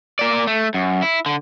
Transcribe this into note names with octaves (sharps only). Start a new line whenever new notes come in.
A#3 D5
A3
F#2
E4
D3